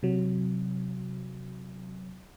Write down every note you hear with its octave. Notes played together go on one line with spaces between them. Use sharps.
C3 F#3